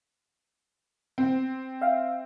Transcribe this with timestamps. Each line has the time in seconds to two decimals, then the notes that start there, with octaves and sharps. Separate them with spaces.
1.18 C4
1.81 E5 F5 G5